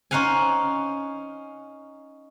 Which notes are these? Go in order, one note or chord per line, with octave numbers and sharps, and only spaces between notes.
C#4 D#4 C5 F5 F#5 G#5